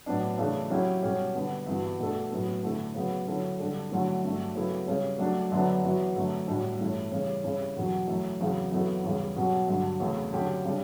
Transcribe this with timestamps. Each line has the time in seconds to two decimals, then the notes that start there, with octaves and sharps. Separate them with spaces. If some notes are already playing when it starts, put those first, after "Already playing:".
0.06 A2 F#3 B3 D4
0.38 C#3 E3 A3 D4
0.70 F#3 C#4 E4 G4
1.02 B2 G3 C#4 G4
1.35 D3 G3 B3
1.67 G2 E3 B3 F#4
1.99 B2 A3 D4 A4
2.30 A2 F#3 B3
2.62 D3 A3 E4 A4
2.94 C#3 F#3 B3
3.27 D3 F#3 C#4 E4 A4
3.59 D3 G3 D4 A4
3.91 D3 F#3 A3 C#4 E4
4.23 G2 F#3 A3 D4
4.55 C#3 F#3 B3 E4 A4
4.87 C#3 G3 C#4
5.18 F#3 A3 D4
5.51 F#2 D3 F#3 B3 D4
5.83 F#2 E3 B3 F#4
6.16 F#2 D3 A3
6.48 A2 G3 D4 F#4
6.79 G2 E3 A3 C#4 E4
7.12 C#3 E3 G3 C#4
7.43 C#3 G3 C#4 E4
7.76 E2 B2 F#3
8.08 F#2 E3 A3
8.40 E2 C#3 F#3 C#4
8.72 F#2 E3 B3 F#4 A4
9.04 E2 C#3 G3
9.36 B2 F#3 C#4
9.67 G2 D3 F#3
10.00 E2 C#3 E3 A3
10.32 D3 F#3 C#4 G4
10.64 C#3 G3 D4